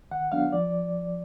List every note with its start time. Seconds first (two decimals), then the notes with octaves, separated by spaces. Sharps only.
0.11 D#3 F#5
0.32 F#3 B3 D4 F5
0.52 F3 D5